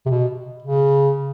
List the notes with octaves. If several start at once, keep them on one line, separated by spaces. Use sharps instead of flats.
C3
B2
C#3